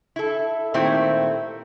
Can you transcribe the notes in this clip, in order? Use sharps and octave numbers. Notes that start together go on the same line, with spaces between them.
E4 A4
A#2 D#3 A3 C4 E4 G4